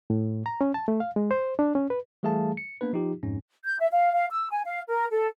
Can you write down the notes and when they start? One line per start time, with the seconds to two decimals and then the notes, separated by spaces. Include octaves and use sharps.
0.10 A2
0.46 A#5
0.61 C#4
0.74 A5
0.88 A3
1.00 F5
1.16 G#3
1.31 C5
1.59 D4
1.75 C#4
1.90 B4
2.23 E3 G3 A3 G#4 F5 A5
2.57 C#7
2.81 A#3 B3 D4 B4
2.93 F3 D#4 F4 G4
3.23 F2 G#2 C#4
3.64 G6
3.79 E5
3.91 F5
4.13 F5
4.31 E6
4.51 G#5
4.65 F5
4.88 A#4
5.11 A4